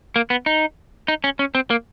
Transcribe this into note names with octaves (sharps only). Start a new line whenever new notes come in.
A#3
B3
D#4
D#4
C#4
C#4
C4
A#3